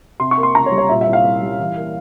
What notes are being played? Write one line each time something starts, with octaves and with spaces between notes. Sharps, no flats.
C3 C6
C#6
A#3
C6
C#2 A#5
C#5
G3
C#5
A#2 E5
E5
C2
F5
C2
G3
E3
A#3